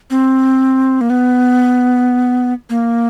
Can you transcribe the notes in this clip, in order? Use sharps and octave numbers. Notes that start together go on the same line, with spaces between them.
C4
A#3
B3
A#3